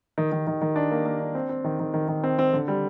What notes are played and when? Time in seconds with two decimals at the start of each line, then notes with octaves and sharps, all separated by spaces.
0.18 D#3
0.32 D#3
0.47 D#3
0.61 D#3
0.76 D4
0.91 A#3
1.06 A#3
1.20 D4
1.35 C4
1.49 C4
1.64 D#3
1.79 D#3
1.94 D#3
2.08 D#3
2.24 C4
2.39 C4
2.53 D3
2.68 G3